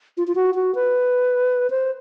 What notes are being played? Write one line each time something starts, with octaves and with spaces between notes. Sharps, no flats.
F4
F4
F#4
F#4
B4
C5